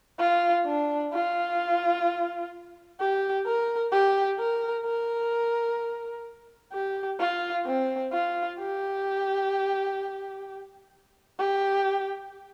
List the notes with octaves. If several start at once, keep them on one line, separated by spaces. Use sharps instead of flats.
F4
D4
F4
G4
A#4
G4
A#4
A#4
G4
F4
C4
F4
G4
G4